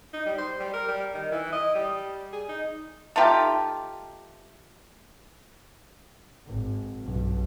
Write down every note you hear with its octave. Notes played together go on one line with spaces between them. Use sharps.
D#4
G3
C5
G3
A#4
G3
D#3
E3
D#5
G3
G#4
D#4
A3 D#4 F4 G4
G#1
B1 G2